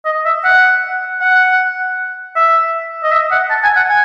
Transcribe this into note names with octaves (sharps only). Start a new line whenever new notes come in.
D#5
E5
F#5
F#5
E5
D#5
E5
F#5
A5
G#5
F#5
G#5